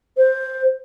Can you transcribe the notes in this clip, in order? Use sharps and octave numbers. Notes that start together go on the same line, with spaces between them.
C5